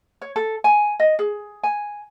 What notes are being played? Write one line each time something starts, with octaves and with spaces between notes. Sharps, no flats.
C#5
A4
G#5
D#5
G#4
G#5